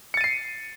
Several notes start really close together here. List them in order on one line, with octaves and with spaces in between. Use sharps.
C#7 A6 D#7 C7